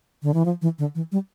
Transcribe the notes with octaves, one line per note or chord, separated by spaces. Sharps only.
D3
E3
F3
E3
D3
E3
G3